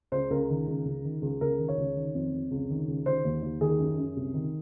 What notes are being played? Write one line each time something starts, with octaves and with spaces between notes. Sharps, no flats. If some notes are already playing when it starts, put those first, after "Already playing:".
C#2 C5
C#2 A#4
D#3
C#2
C#2
D#3
C#2
C#2 A#4
D#3
C#5
C#2
D#3
F2
F2
C#2
D#3
C#2
D#3 C5
D#2
D#2
D#3 G#4
F#2
F#2
C2
D#3